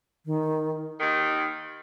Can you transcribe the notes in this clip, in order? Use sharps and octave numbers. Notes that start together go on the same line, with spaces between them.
D#3
D#2 D#3